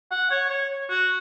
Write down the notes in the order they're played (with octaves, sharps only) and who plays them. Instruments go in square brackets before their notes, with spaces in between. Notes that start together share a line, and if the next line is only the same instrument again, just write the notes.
[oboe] F#5
C#5
C#5
F#4